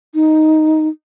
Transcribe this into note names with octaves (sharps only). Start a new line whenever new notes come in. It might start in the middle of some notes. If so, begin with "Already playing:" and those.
D#4